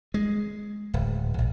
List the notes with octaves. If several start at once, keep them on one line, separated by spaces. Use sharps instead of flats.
G#3
D1
A#1